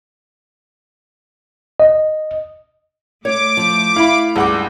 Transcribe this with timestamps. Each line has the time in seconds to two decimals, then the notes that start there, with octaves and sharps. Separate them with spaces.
1.80 D#5
3.25 A3 C#5 D6
3.57 F3
3.96 E4 F5 B5
4.36 C#2 G2 F#5 D6